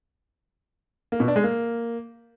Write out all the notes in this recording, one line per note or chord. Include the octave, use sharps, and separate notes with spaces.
A#3
B2
D4
G#3
A#3